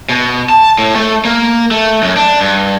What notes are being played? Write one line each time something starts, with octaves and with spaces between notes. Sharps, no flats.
B2
A5
A2
A3
A#3
A3
F#2
D4
G2